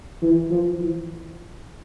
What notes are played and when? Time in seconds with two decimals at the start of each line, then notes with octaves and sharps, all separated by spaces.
0.22 E3
0.51 F3
0.79 E3